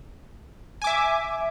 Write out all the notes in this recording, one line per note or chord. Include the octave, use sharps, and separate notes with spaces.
E5 G#5 D6